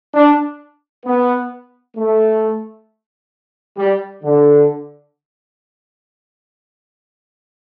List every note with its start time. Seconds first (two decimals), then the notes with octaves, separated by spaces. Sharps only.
0.14 D4
1.05 B3
1.96 A3
3.78 G3
4.23 D3